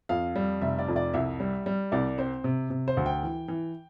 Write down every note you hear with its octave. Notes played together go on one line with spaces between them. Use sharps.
F2 F5
G3
F1 E5
D5
F2
D5
C2 E5
G3
G3
C2 D5
C4 C5
C3
C3
C5
D2
G5
E3
E3